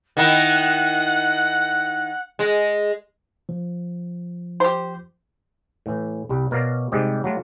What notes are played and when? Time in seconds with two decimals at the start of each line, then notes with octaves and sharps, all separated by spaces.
0.17 D#3 D#4 E4 F#5
2.39 G#3
3.49 F3
4.60 G4 C5
5.86 A2 E3
6.29 C2 G3
6.51 B2 A#4 C#5 D5 F5 A#5
6.92 G#2 C3 G3 G#3 G4 D5
7.24 F#3 G3 A3 D4 F4